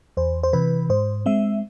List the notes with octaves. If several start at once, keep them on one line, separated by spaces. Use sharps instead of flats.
E2 C5
C5
C3 E3 B4
G#2 C5
G#3 C4 E5